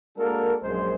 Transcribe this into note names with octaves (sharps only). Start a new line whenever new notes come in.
G#3 A#3 D4 F#4 A4 A#4
A#1 F#2 G#3 C5